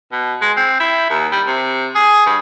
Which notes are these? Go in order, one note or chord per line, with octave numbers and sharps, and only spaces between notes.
B2
G#3
C4
E4
D#2
G3
C3
G#4
G2